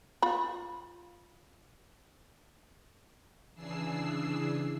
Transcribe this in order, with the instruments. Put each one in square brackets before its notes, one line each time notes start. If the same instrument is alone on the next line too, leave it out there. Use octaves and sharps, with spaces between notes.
[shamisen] F4 B5
[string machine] C#3 E3 D4 G#4 E6 C7